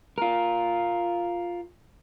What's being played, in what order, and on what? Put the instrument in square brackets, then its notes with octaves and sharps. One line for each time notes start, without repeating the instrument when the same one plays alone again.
[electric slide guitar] F4 A#4